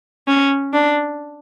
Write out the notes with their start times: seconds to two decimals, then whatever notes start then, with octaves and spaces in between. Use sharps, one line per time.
0.27 C#4
0.73 D4